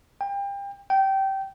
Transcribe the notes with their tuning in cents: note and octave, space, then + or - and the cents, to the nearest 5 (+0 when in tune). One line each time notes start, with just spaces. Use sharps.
G5 +30
G5 -20